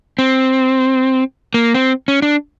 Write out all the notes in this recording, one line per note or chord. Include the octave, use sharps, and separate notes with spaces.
C4
A#3
C4
C#4
D4